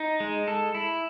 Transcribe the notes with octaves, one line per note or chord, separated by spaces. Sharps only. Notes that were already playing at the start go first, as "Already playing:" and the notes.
Already playing: D#4
G#3
A4
E4